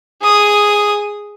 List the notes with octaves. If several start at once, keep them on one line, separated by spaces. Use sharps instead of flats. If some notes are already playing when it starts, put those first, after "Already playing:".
G#4 D#6